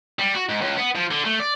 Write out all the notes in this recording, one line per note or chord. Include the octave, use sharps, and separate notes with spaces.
G3
F#4
G#2
C#2
B3
F3
D3
A3
D5